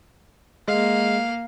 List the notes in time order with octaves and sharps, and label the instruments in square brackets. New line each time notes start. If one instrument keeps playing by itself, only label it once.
[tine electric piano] G#3 [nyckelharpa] A#3 F5